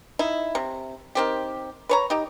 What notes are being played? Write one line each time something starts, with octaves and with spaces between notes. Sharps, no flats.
D#4 E4
C3
D#3 C4 G4
B4 C#5 A#5
D#4 G4